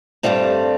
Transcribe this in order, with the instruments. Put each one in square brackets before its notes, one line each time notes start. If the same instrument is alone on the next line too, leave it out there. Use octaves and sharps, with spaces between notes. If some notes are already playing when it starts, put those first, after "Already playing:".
[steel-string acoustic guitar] G2 E3 G3 A3 C4